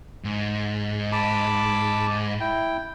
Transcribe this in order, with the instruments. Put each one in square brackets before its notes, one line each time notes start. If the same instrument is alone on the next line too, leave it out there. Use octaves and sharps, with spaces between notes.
[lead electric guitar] G#2
[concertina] A5 B5 D6
E4 G5